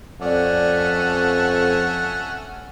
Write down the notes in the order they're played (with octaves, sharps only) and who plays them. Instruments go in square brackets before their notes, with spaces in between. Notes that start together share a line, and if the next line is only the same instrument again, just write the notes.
[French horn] F2 [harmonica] A3 C#4 [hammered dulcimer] D5 A5 [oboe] F#5